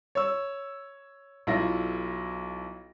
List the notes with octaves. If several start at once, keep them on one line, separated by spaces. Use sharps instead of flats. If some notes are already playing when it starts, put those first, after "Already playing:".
C#5 E6
B1 E4 F4 A#6